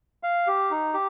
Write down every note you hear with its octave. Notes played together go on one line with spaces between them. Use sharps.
F5
G4
D#4
G4